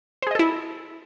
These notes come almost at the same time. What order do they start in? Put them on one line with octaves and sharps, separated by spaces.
C5 G#4 D#5 A4 E4